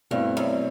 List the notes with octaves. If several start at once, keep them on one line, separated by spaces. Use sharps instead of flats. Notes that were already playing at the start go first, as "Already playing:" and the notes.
G2 B2 A3 C4 E4
F#2